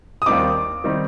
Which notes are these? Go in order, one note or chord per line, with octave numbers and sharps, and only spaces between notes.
D#6
D#2 D#3 G3 C4 D#4 D6
D#3 G3 C4 D#4